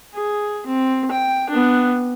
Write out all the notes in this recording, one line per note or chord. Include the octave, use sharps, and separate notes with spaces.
G#4
C4
G5
B3 D4